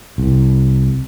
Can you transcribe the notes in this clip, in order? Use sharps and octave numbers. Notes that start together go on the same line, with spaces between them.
C2